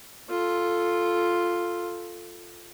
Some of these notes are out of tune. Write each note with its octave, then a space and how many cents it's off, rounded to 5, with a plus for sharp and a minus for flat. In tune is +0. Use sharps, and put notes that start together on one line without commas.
F4 +0 A4 +0